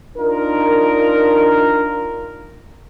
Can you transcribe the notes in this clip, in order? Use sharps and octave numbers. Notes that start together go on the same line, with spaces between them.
D4 D#4 F4 A#4